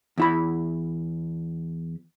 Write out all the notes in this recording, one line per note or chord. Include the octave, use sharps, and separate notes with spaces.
E2 E4 B5